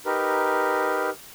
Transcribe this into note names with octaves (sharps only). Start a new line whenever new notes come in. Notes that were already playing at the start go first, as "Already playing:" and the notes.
D#4 G4 A#4 B4